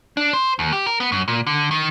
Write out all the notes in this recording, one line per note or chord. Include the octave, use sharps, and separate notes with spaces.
D4
C5
D#2
G4
A#4
B3
F#2
A#2
D3
D#3